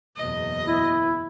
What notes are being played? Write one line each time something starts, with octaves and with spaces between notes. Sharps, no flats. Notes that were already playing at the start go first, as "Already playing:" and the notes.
F#1 E2 B2 D#5
E4